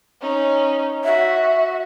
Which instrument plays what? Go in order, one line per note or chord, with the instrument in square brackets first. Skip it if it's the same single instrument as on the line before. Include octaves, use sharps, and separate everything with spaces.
[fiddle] C#4 D#4
[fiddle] F#4 [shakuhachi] E5